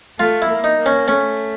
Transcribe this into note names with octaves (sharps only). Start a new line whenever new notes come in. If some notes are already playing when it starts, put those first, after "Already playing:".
A3 F4
E4
A#3
D#4
A#3
C#4
A3 C#4